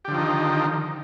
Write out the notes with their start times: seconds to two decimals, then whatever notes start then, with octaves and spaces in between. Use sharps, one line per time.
0.05 G4
0.08 D3
0.11 F3
0.15 D#4
0.18 D#3